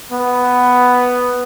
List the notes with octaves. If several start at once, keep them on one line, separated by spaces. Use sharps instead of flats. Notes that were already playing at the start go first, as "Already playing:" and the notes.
B3